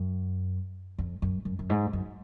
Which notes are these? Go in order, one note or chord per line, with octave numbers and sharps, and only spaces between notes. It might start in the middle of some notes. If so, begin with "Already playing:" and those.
Already playing: F#2
F2
F#2
F#2
F#2
G#2
F#2